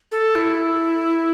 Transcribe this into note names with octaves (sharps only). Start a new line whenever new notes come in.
A4
E4